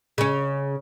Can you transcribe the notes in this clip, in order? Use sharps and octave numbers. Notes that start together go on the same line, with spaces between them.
C#3 C#4